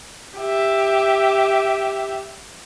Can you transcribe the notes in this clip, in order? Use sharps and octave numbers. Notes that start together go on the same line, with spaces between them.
G4 E5